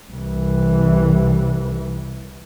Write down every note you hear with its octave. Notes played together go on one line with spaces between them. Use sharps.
C2 E3